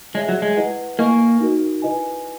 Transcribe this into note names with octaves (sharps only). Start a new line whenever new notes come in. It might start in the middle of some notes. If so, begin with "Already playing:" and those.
G#3 G#4 C#5 E5
F#3
G#3
E4 B4 D#5 F#5
A#3 E4 A#4 D#5 G#5 C#6
D#4 F#4 A#4
E4 B4 D#5 G#5